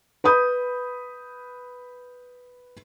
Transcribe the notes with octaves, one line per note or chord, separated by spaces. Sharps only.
B4 B5 D#6 G6